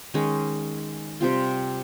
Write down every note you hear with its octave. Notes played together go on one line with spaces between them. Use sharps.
D#3 G#3 C#4
C3 G3 C4 F4